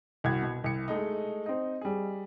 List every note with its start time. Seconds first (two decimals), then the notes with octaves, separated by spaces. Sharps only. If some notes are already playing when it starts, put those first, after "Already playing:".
0.24 C2 F#4 G#6
0.42 B2
0.64 C2 C#7
0.88 G#3 A3 D#4
1.46 C4 D#4
1.81 G3 G#4